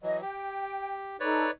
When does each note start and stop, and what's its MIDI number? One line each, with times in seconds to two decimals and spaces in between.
0.03 0.22 52
0.03 0.22 54
0.03 0.21 75
0.22 1.17 67
0.22 0.94 79
1.20 1.47 63
1.20 1.47 69
1.20 1.51 71
1.20 1.51 73
1.20 1.51 74